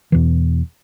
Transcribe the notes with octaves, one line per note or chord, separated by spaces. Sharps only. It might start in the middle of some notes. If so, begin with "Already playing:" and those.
E2 B2 E3